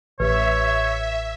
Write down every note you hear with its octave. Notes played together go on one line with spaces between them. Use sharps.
A1 G4 B4 C#5 E5